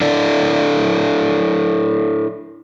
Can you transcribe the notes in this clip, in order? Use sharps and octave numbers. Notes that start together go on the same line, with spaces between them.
D4 E4 A4 D5